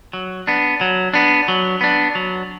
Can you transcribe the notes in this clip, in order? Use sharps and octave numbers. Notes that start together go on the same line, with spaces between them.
F#3
B3 D4
F#3
B3 D4
F#3
B3 D4
F#3